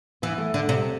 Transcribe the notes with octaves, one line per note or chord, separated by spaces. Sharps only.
E3 B3
A3
D3
C3